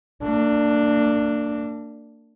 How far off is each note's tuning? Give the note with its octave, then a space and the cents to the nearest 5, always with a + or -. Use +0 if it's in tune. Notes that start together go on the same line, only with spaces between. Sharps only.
A#3 -40 D4 +0